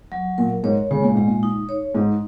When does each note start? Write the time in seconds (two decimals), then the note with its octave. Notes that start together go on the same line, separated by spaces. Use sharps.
0.12 F#3
0.38 A#2 A#4
0.64 G#2 C#5
0.91 C#3 G#3
1.02 A#2
1.14 G#2 G#3
1.26 A#2
1.43 D#4
1.69 C#5
1.95 G#2 D#4